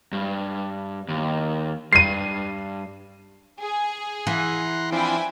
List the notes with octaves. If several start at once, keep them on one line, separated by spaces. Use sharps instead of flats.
G2
D#2
G2 C7 D#7
G#4
E3 F#5 A#5 C6
F3 C4 D4 E4 G5 G#5